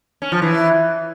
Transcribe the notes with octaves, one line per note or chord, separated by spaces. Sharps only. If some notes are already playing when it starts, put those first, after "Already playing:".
C#4
F3
E3